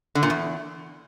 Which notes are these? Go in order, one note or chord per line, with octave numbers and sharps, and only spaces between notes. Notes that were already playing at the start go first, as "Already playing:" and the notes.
D3
A#2
E2